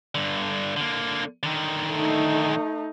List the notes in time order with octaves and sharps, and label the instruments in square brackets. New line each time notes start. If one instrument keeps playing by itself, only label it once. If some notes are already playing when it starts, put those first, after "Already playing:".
[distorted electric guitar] G2 D3
D3 A#3
D3 D#3
[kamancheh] A3 D#4